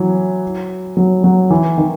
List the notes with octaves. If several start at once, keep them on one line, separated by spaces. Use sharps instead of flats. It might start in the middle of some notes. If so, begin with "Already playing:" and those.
Already playing: E3 F#3
F#3
F#3
E3
D#3